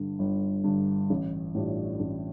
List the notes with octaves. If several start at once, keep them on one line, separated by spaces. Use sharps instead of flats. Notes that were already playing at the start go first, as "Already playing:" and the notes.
Already playing: G1 G2 D3
G1
G2 D3
A1
A2 G3 D4 F4
A1